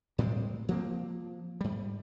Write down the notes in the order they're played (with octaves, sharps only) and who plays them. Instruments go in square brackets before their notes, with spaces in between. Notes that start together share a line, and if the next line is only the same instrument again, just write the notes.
[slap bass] A2 G3 G#3 C4
F3 A#3 C4
G#2 G3